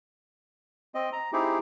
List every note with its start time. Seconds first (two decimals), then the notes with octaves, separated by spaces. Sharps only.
0.95 C4 D#5
1.13 A#5
1.33 C4 D#4 E4 G4 G#4